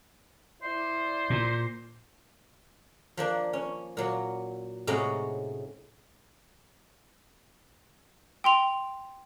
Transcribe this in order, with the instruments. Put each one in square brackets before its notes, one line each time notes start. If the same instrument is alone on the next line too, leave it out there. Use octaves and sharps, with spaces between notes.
[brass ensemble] E4 D5 [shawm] C5
[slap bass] A#2
[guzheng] F3 A#3 D4
C#4
A#2 F#3
A2 C3 G#3 C#4 D#4 F#4
[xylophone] G5 C6 F7